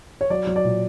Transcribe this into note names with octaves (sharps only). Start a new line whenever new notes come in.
C#5
F#3 D5
F#3
D5
A#2